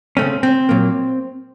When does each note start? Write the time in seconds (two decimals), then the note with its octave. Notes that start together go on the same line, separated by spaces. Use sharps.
0.17 C#3 A3 C4 C#4
0.43 C4
0.69 A#2 F#3 A#3